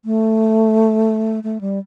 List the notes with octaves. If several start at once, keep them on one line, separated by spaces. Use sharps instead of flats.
A3
A3
G3